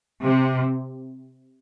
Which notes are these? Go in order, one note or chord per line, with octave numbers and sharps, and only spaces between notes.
C3